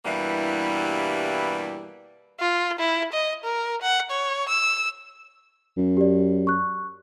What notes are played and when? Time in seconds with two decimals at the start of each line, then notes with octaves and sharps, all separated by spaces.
0.05 G2 B2 E3 G3 A#3 E4
2.40 F4
2.80 E4
3.13 D#5
3.44 A#4
3.82 F#5
4.11 C#5
4.49 E6
5.77 F#2
5.97 G4 D5
6.47 C#6 F#6